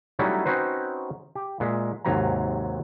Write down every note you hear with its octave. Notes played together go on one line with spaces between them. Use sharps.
F#3 G3 A3 C#4 D#4 E4
C4 C#4 D#4 F#4 B4 C5
G4
A#2 G#3 E5
D#2 G#2 C3 F#3 G#5 A#5